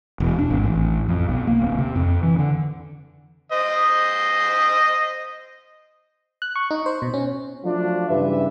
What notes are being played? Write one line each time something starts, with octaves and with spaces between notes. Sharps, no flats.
E1
D4
G#1
A1
F2
B1
A#3
D1
C3
F2
E3
D3
C5 D#5
F#6
C#6
D#4
C5
B2
C#4
F3 F#3 A3 D4 F4
G2 C#3 E3 G3 B4 E5